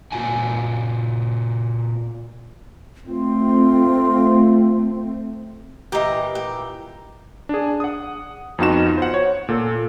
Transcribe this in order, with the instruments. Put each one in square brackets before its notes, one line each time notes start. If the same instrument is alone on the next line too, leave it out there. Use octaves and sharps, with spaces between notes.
[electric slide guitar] A#2 F4 F#4 G#5
[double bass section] A3 C4 [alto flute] F4
[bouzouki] A#2 E3 A#3 [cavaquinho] G4 D#5
[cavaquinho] G4
[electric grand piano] D4 G#4
F#5 D#6
F2 B3 D#4 F4 F#4 E7
C5 F#5
C#5
A#2 A4